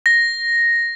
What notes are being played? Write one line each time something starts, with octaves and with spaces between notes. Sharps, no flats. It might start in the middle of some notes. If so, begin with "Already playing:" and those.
A#6